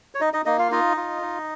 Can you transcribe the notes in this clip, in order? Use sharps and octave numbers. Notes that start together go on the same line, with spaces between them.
C#5
D#4 D#5
D#4 D#5
A#3 D#4 D#5
F4 F5
D#4 F4 D#5
F4
D#4